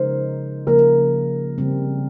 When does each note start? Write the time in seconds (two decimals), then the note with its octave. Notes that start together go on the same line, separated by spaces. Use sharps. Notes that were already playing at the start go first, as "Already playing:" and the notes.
Already playing: C#3 F3 G#3 D#4 A#4 C5
0.67 C#3 F3 A#3 A#4
1.58 C#3 G3 C4